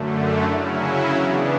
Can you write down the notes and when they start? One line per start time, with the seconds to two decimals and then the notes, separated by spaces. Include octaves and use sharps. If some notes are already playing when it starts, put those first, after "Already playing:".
Already playing: F#2 D3 A3
0.44 C#3 F#3 C#4 E4
1.12 C#3 E3 B3 D4